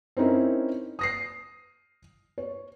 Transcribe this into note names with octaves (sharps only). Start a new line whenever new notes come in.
C4 C#4 D#4 E4 A#4
D#6 A#6 C7
C#5